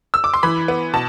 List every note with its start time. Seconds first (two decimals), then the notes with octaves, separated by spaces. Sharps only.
0.14 E6
0.24 D6
0.34 C6
0.43 E3 B5
0.68 B3
0.94 B2 A5